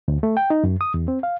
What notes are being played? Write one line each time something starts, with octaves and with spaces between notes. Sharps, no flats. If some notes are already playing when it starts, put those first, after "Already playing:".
D2
A3
G5
D#4
F#2
D#6
E2
C4
F5